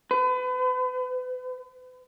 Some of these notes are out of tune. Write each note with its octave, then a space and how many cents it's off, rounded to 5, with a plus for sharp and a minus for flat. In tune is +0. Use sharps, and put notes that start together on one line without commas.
B4 +35